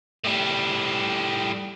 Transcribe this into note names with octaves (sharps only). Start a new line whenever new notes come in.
A2 G3